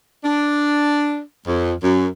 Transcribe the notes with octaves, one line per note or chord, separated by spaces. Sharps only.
D4
F2
F#2